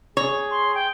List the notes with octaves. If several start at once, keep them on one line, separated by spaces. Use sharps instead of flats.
G#4 C#5
C6
G5